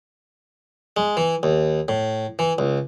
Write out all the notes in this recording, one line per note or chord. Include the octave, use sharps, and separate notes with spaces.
G#3
E3
D#2
A2
E3
C#2